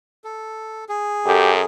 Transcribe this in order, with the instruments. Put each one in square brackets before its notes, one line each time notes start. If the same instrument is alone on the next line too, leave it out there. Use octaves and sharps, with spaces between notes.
[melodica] A4
G#4
[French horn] F#2 [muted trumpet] G4 [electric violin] A4